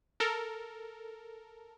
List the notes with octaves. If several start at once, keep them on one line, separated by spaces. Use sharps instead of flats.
A4 A#4